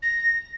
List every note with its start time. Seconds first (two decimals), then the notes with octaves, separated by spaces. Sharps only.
0.03 A#6